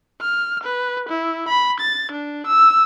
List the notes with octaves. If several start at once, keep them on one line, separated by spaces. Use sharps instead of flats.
F6
B4
E4
B5
A6
D4
E6